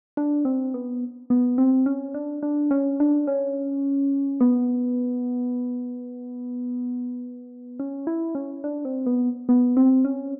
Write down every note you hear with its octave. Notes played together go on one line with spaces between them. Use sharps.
D4
C4
B3
B3
C4
C#4
D4
D4
C#4
D4
C#4
B3
C#4
E4
C#4
D4
C4
B3
B3
C4
C#4